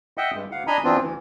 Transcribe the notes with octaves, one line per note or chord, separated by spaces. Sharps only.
D#5 E5 F#5 G5
G2 G#3
D2 F5 F#5
D4 D#5 G#5 A#5 B5
F#2 E3 B3 C4 D4 F4
D2 E3